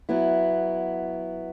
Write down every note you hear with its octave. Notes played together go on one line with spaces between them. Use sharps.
F#3 B3 E4